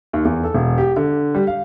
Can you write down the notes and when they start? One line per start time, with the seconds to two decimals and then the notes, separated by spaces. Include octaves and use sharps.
0.13 D#2
0.25 E2
0.43 A4
0.54 E1
0.78 G4
0.97 D3
1.35 G3
1.47 F5